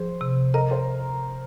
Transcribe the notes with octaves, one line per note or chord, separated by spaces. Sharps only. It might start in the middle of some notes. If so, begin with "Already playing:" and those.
Already playing: F3 G#4 C5
C3
A#4 D#5
C5